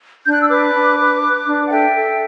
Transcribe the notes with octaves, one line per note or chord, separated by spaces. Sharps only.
D4 G6
F#6
E6
B4 D6 F#6
D4
B4
B4
D4
F#5
A4 E5 G5
A4